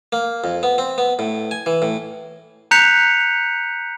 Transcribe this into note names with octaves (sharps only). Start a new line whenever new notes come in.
A#3
F2
B3
C4
B3
A2
G#5
E3
A2
A#5 F#6 G6 B6 C#7 F7